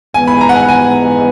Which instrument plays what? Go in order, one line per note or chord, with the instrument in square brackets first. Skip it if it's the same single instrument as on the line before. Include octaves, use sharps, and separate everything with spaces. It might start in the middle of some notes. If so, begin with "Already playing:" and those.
[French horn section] G#2 E3 G#3 B3 [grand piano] G#5
[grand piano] B5
A#5
F#5
G#5
G#5